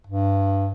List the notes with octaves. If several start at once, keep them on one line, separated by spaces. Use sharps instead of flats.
G2